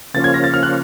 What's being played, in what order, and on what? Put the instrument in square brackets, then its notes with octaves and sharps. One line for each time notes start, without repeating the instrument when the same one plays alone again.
[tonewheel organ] C#3 F3 A#3 C#4 F4 [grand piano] A6
[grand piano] G#6
A#6
A6
F6
F#6